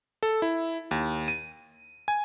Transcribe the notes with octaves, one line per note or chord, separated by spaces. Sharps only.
A4
E4
D#2
D#7
G#5